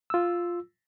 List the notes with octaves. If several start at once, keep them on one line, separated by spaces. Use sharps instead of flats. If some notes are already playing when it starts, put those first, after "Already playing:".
F4 E6